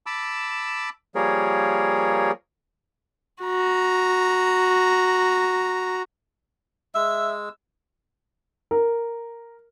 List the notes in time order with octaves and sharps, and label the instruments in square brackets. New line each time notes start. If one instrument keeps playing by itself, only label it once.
[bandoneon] A5 B5 D6 E6
F3 G3 A#3 G#4 A#4 C#5
[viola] F#4 A#5
[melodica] G#3 E6 [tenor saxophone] E5
[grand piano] A#4